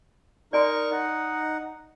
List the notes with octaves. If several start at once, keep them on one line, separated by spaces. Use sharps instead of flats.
D#4 A#4 D5 G#5 C6 C#6
D#4 D#5 F#5